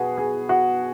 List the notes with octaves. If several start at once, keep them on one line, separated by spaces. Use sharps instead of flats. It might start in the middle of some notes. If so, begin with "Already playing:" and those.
Already playing: B2 F#4 G#4 B4
G#4
F#4